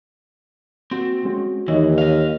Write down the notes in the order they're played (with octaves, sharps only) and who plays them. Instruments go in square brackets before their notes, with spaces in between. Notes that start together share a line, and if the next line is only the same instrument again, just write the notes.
[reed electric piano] A#3 F#4 [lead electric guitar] C4
[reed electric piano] G#3 C#4 F#4
[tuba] D#2 [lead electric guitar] E3 [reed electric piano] D#4 C#5 D#5
[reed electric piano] C#5 [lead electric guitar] D#5 F5